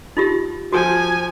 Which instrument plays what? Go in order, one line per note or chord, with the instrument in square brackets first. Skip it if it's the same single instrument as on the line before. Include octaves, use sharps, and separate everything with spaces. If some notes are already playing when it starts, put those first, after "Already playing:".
[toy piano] D#4 F4 G4
[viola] F3 G#5 [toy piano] F#4